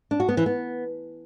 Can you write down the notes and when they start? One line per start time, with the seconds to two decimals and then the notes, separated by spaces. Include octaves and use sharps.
0.11 D4
0.20 F#4
0.29 B3
0.37 E3
0.46 B3